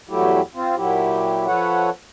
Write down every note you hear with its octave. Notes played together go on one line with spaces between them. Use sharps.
E2 G2 F#3 A3 E4 G4
C4 F4
A#2 F#3 E4 G4
F3 A4 B4 C#5 F#5